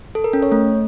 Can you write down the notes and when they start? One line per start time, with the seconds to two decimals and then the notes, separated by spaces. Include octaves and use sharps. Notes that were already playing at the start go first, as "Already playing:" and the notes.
0.15 A4
0.24 A#4
0.33 C#4
0.43 C#5
0.52 A3